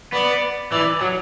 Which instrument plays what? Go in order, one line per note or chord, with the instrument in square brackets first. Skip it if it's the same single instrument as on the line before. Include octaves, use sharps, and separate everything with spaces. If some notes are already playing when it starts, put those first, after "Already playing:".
[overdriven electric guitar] B3 [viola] D5
[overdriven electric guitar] E3 [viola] D5
[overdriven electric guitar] F#3